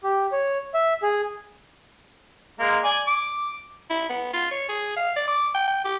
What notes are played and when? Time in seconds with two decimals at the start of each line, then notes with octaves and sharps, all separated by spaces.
0.03 G4
0.32 C#5
0.74 E5
1.03 G#4
2.59 G#3 A#3
2.84 D5 G#5
3.07 D6
3.90 E4
4.09 B3
4.33 F4
4.51 C#5
4.69 G#4
4.96 F5
5.16 D5
5.28 D6
5.55 G5
5.68 G5
5.85 G4